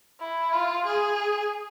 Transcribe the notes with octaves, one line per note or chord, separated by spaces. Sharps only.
E4
F4
G#4